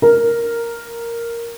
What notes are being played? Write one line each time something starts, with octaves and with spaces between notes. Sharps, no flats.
A#4